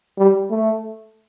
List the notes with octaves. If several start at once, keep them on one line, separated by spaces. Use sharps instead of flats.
G3
A3